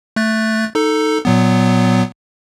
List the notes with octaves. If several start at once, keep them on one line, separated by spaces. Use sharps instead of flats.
A3 F#6 A6
D#4 A4
A#2 F#3 B3